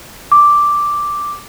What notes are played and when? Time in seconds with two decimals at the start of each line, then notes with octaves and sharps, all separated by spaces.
0.32 D6